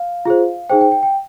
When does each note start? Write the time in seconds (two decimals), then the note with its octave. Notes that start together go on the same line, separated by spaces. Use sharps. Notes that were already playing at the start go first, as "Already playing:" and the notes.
Already playing: F5
0.25 F4 G#4 C5
0.70 D#4 G#4 C5 G5
0.81 G5
0.92 G5
1.03 G5